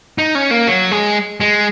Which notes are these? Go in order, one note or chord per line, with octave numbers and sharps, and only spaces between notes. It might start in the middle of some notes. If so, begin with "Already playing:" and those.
D#4
C#4
A#3
F#3
G#3
G#3